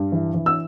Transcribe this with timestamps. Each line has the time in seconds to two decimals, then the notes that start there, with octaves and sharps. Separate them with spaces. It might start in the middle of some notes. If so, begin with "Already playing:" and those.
Already playing: G2
0.12 E3
0.34 E3
0.46 E6